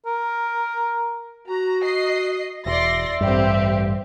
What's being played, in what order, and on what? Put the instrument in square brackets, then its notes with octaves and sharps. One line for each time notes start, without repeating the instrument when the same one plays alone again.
[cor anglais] A#4
[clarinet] F#4 [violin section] A#5
[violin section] D#5 C7
[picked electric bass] E1 [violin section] D5 C6 A#6 [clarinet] E5
[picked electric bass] A1 G2 [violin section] C4 G4